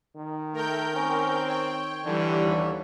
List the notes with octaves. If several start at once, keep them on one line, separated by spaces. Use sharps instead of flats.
D#3
A3 A#4 G5 G6
C4 C#4
C#5 G5
D3 E3 G3
D#2